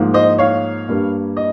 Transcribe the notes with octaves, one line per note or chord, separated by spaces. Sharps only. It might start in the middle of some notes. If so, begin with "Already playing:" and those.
Already playing: G#2 F3 A#3
C5 D#5
C#5 F5
G2 G3 A#3
D#5